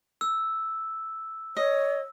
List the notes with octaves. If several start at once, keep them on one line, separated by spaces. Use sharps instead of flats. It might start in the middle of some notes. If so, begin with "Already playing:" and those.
E6
C#5 D#5